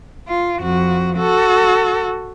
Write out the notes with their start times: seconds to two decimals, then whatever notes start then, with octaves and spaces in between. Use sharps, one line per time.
0.28 F4
0.60 F2 F#4
1.17 F#4 A4